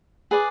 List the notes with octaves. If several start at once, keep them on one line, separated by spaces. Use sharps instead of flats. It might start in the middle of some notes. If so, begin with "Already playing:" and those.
G#4 B4 D5